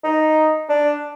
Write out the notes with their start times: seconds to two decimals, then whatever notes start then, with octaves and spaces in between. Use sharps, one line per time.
0.04 D#4
0.69 D4